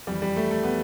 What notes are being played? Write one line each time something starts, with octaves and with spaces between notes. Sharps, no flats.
F2 E3 G3
G3
A3
A3
B3